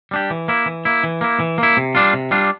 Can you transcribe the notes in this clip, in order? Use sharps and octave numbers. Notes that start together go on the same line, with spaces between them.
G3 D4 G4
E3
A#3 E4
E3
A#3 E4
E3
A#3 E4
E3
A#3 E4
C3
G3 D4 F4
C3
G3 D4 F4